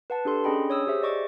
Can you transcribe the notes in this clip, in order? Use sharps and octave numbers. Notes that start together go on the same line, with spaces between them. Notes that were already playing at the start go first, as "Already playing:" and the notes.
B4 F#5 A5
D4 G4 A4 C6
C#4 D4 G#4 D#5 G5 B5
C#5 D#6 E6
G4 G#4 C5 E5
D5 D#5 C#6 D6